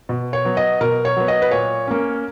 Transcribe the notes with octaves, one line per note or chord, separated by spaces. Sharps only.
B2
C#5
F#3 B3
D#5
B2 A#4
C#5
F#3 B3
D#5
B4
A#2 C#5
A#3 C#4